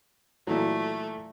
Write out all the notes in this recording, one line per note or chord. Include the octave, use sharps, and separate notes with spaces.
A#2 E3 F#3 A3